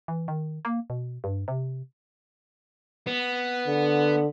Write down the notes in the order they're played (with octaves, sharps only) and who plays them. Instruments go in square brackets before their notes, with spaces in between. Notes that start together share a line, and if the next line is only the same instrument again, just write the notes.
[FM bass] E3
D#3
A#3
B2
G2
C3
[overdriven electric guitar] B3
[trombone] D3